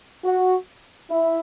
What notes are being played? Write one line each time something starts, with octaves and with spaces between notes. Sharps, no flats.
F#4
E4